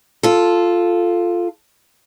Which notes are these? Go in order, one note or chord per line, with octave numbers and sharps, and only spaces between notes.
F4 A4